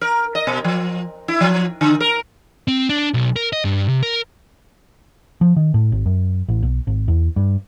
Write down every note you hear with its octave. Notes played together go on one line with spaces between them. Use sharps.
A#4
D#5
B2
F3
E4
F3
D3
A#4
C4
D4
B1
A#4
D#5
G2
C3
A#4
F3
D#3
A2
G#1
F#2
A1
B1
G#1
E2
G2